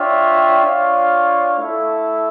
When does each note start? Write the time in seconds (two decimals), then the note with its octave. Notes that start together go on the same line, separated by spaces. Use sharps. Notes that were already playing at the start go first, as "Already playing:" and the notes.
Already playing: D4 F4 C#5 E5 G5
0.65 D4 F4 C#5 F5
1.58 A3 E4 A4